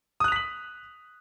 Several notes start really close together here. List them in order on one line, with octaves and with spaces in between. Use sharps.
D#6 F#6 F7 B6 F#7